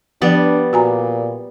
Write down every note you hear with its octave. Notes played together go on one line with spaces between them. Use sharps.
F3 G3 B3 D4 D5
A#2 F#4 G#5 A#5